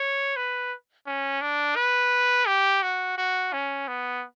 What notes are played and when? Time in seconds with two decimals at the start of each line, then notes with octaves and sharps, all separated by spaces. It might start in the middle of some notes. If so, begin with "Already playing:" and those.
Already playing: C#5
0.36 B4
1.06 C#4
1.41 D4
1.76 B4
2.47 G4
2.82 F#4
3.18 F#4
3.53 C#4
3.88 B3